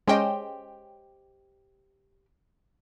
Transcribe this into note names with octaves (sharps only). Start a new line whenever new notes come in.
G#3 C#4 G4 C5 D#5 G5